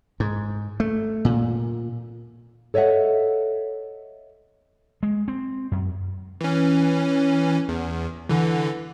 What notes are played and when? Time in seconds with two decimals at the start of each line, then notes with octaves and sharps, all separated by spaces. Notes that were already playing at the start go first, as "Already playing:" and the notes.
0.20 G#2
0.80 A3
1.25 A#2
2.74 A4 C#5 D#5 E5 F#5
5.03 G#3
5.28 C4
5.72 F#2
6.41 E3 C#4
7.68 E2
8.29 D3 E3